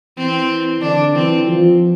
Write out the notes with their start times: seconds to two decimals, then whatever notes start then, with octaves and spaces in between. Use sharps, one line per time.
0.17 E3 C4
0.81 D3 D4
1.15 E3 C4
1.47 F3